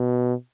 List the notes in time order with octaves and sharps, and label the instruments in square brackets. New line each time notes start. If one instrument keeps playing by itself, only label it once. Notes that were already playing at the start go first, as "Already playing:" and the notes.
Already playing: [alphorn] B2